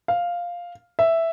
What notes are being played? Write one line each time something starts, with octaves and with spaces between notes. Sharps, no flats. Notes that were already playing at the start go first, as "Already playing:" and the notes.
F5
E5